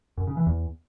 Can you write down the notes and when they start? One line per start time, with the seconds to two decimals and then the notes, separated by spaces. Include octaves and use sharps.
0.17 F#2
0.27 C#3
0.37 E3
0.46 E2